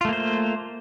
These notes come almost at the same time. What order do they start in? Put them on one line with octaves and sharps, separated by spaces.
F4 A3 A#3 C5